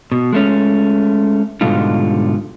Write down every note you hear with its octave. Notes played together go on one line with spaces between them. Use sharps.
B2
G#3 A3 C#4
G#2 B2 D3 G3 D#4 F4